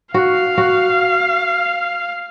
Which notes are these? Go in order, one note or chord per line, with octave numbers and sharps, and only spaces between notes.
F#4 F5
F#4